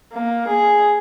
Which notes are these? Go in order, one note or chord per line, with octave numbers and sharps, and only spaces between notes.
A#3
G#4